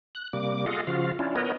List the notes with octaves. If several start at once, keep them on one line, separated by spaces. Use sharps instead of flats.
F#6
C3 G3 A#3 D6
F4 G#4 A4 D#5 F5 F#5
C#3 F3 F4 F#4 F5
C#4 D4 E4 F4
B3 A#4 B4 C#5 D#5